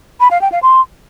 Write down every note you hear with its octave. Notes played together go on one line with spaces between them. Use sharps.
B5
F5
G5
F5
C6